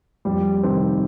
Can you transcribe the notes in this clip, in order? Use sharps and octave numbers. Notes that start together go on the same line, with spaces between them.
F2 G3
C3 D#3 C4